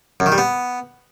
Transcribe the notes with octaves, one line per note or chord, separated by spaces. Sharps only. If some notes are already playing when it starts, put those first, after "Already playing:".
F#2
D#3
G3
B3